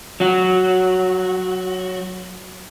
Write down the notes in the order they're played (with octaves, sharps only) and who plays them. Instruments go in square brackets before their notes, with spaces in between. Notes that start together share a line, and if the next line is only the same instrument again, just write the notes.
[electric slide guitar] F#3 F#4